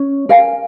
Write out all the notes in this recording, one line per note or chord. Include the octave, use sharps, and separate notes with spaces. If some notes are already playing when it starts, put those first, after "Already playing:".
Already playing: C#4 C#5
A#4 F5 G#5